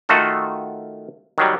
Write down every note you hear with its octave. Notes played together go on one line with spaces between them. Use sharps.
D#3 A3 F4 F#4 A4
D#3 F#3 G3